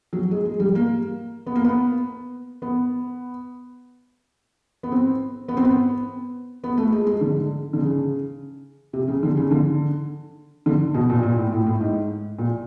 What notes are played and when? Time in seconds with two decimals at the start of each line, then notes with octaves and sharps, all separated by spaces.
0.13 F#3
0.31 G#3
0.45 G#3
0.60 G3
0.75 A#3
1.47 B3
1.56 A#3
1.64 B3
2.62 B3
4.83 B3
4.92 C4
5.48 B3
5.57 C4
5.65 B3
6.64 B3
6.78 A3
6.92 G#3
7.07 G#3
7.21 D3
7.73 D3
7.79 C#3
8.93 C3
9.08 C#3
9.23 D3
9.37 C#3
9.51 D3
10.66 D3
10.94 B2
11.10 A#2
11.23 A#2
11.38 A2
11.52 A2
11.67 A2
11.81 G#2
12.39 A#2